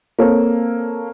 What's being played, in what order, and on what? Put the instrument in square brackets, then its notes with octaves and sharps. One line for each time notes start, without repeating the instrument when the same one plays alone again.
[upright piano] A#3 C4 A4 C#5